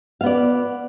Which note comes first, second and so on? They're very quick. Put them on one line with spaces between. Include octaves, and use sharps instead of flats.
F5 B3 D5